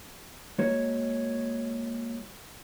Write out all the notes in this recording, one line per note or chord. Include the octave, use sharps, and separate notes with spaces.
G#3 A#3 F#4 C#5